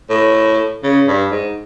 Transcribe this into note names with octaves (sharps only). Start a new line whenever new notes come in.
A2
C#3
G2
G#2